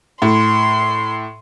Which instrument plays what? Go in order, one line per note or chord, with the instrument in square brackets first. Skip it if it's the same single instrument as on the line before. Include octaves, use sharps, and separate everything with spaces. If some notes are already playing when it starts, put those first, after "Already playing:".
[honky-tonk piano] A2 [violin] C6